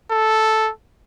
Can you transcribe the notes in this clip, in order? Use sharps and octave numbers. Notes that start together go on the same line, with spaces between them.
A4